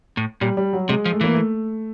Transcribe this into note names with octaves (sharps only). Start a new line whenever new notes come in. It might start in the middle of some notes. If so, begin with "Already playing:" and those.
A2
A#2 G3
G3
F#3
C3 G#3
F3
A3
E3 A#3
A3